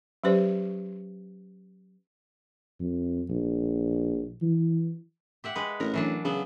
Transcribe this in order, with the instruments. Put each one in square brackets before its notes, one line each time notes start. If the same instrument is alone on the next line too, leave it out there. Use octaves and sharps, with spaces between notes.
[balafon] F#3 C#4 G4 B4 C5 D5
[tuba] F2
A#1
E3
[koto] G4 E5 F#5
G#3 B4
[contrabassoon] A1 [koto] A#4
[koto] E3 F#3 D4
[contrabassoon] C#3 [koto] F#3 B3